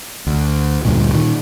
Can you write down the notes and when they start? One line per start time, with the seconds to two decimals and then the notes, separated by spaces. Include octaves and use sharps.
0.27 D2
0.85 D2 G2 A#2
1.13 A#2 D#3